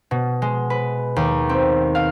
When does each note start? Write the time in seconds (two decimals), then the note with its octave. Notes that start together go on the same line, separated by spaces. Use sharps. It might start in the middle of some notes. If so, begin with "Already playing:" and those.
0.11 B2
0.42 G#3
0.70 B4
1.16 D#2
1.49 C4
1.95 F5